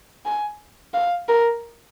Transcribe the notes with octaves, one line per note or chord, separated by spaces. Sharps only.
G#5
F5
A#4